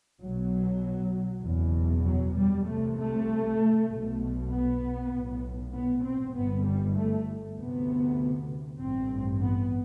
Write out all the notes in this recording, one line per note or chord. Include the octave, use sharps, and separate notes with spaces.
B1 B2 F#3
F#1 E2 B2
F#3
G3
C2 C3 A3
A3
B1 B2
B3
B1 A2
B3
C4
G1 G2 B3
G3
A3
D2 C3 B3
A1 G2 C4
B3